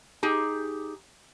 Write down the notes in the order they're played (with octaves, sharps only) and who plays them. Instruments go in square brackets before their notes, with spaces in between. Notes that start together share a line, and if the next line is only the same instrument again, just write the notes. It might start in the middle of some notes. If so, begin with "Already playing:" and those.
[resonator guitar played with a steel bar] D#4 G4 G#4